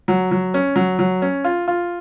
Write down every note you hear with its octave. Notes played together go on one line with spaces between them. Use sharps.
F#3
F#3
C#4
F#3
F#3
C#4
F4
F4